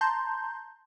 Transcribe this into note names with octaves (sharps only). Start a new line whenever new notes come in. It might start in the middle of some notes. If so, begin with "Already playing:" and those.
A5 A#5 C6 G6